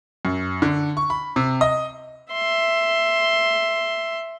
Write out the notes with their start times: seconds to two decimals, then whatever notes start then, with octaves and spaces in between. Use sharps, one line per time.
0.25 F#2
0.62 D3
0.97 C#6
1.10 B5
1.36 C3
1.61 D#5
2.33 E5 C6